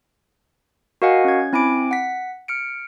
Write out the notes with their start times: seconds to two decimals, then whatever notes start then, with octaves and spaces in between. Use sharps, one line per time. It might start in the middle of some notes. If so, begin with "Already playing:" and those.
1.02 F#4 A#4 D#5 F5 F#5 G#5
1.25 C#4 G#6
1.53 C4 E4 G#5 B5 D6 D7
1.91 F#5 B6
2.48 F6 C#7 D7